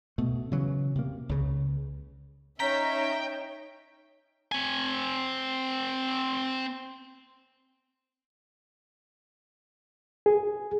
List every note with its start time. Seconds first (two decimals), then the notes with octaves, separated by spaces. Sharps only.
0.18 B2 A3
0.51 C#3 E3 F#3
0.95 C3 A#3
1.29 C#2 C#3
2.60 C#4 D#4 C#5 E5 G5 A#5 B6
4.52 C4 G#5
10.26 G#4